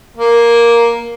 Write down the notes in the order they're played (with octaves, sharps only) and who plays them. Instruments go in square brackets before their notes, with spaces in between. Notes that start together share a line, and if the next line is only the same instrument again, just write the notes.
[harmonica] A#3